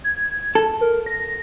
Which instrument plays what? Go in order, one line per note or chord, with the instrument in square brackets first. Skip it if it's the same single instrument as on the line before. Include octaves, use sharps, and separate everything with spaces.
[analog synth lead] G#6
[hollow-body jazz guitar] A4
[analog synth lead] A#4
A#6